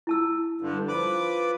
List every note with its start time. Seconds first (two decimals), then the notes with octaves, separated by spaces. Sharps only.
0.07 E4 A5 E6
0.61 G2 D3
0.88 F3 B4 B5 D6